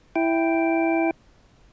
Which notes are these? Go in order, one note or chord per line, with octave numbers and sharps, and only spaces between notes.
E4 G5